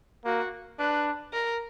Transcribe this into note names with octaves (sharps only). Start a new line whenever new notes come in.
A#3 F#4
D4 B4
A#4